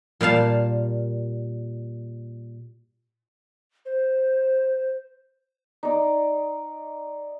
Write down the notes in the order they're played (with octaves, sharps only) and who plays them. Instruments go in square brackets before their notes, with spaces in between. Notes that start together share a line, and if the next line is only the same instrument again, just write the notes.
[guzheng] A#2 G3 F5 A5
[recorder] C5
[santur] D#4 D5